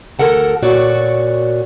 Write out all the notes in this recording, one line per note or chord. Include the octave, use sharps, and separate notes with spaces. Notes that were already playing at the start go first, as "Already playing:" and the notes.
D2 G3 A4 A#4 F#5 A5
A#2 F#4 C#5 D5